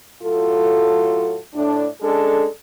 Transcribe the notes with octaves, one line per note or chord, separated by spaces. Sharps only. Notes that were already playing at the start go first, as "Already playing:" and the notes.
A2 F#3 F4 A4
A2 D4
G#3 C#4 D4 A4